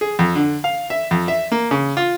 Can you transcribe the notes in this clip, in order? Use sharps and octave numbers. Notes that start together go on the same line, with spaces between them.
G#4
F2
D3
F5
E5
F2
E5
A#3
C#3
F4